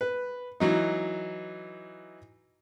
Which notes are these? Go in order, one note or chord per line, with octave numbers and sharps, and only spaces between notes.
B4
E3 F#3 D#4